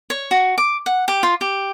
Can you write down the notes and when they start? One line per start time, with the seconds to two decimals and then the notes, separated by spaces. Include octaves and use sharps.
0.10 C#5
0.31 F#4
0.58 D6
0.86 F#5
1.08 G4
1.23 F4
1.41 G4